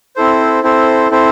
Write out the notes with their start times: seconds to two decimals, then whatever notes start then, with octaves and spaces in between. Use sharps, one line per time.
0.16 C4 E4 A4 C5
0.63 C4 E4 A4 C5
1.11 C4 E4 A4 C5